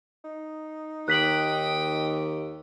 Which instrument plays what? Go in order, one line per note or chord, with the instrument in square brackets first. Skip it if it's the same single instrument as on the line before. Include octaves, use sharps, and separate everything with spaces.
[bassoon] D#4
[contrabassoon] D#2 [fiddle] G5 D#6 [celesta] F#6 B6 F#7